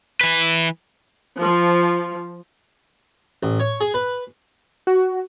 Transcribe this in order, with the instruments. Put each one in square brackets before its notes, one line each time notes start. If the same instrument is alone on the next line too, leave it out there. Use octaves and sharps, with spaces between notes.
[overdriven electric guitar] E3 B4
[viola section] F3
[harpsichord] A1
C#5
G#4
B4
[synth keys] F#4